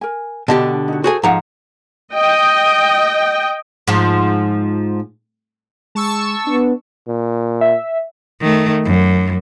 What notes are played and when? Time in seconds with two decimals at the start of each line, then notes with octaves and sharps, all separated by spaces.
0.01 A#4 G#5
0.48 B2 D3 D4 G4 D#5 A5
0.88 D#4 F#4
1.04 F#4 G#4 A4 C5 G#5
1.23 G#2 F3 F#5 A#5
2.13 D#5 G5
3.88 G#2 F3
5.95 G#3 A5 C#6 E6
6.47 B3 D4
7.08 A#2
7.61 E5
8.41 D#3 A3
8.85 F#2